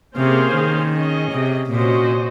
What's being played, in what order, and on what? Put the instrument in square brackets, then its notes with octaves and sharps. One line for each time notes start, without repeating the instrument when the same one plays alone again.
[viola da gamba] C3 [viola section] A#3 C#4 G#4 C5 F5
[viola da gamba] D#3
[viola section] C#4 G#4 D#5
[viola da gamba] C3
[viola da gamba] A#2 [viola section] C#4 F#4 C5 D#5